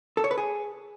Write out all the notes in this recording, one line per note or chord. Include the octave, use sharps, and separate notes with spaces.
A4
C#5
B4
G#4